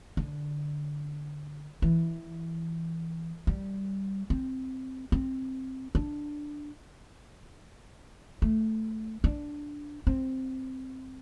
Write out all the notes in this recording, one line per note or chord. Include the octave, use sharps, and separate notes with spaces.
D3
E3
G3
C4
C4
D4
A3
D4
C4